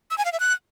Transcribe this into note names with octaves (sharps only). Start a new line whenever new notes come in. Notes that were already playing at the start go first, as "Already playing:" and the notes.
E6
G#5
F5
E5
F#6